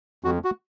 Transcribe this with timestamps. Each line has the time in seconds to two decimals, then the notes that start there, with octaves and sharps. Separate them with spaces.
0.24 F2 F#4
0.44 F#4